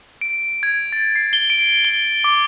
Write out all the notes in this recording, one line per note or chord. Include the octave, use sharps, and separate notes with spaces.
D7
G#6
A6
C7
G7
D7
G7
D6